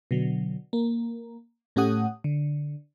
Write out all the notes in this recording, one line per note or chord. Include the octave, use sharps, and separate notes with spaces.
B2 D3 F#3
A#3
A2 A3 C#4 G4 F#5 D#6
D3